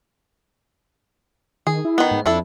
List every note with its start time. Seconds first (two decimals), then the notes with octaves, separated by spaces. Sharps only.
1.67 D#3 G#4
1.85 E4
1.98 D#3 B3
2.11 G#2
2.26 F2 D4 E4 A4